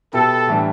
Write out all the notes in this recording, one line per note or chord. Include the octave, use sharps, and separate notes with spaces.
B2 B3 E4 G4 A4
A2 E3 G3 D4